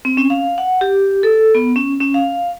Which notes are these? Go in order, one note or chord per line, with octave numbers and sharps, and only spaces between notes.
C4
C#4
F5
F#5
G4
A4
B3
C#4
C#4
F5